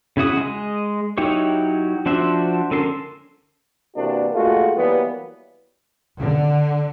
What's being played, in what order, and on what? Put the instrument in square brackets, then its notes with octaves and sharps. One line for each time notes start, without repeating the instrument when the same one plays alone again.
[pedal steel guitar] C#3 E4 F#4 D#6
G#3 D#5
F#3 D#4 E4 G4 C#5
F3 D4 F#4 C5 E5
D3 C#4 A4 A#4 C6
[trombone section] C3 E3 A#3 D4 F#4
A#2 G#3 A3 F4 F#4
E3 F#3 G3 A#3 B3
[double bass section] D3